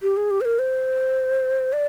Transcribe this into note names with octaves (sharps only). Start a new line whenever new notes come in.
G4
G#4
G4
C5
A#4
C5
D5